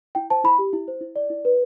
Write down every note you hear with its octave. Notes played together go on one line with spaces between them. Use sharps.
E4 G5
C5 A5
E4 B5
G4
E4
C5
E4
D5
E4
B4